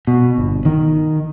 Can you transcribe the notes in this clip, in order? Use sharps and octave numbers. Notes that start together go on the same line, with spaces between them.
B2
G1
D#3